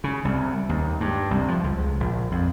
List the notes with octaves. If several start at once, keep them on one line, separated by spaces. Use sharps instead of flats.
C#3
C2
D#2
G2
C2
F3
C#2
A#1
F2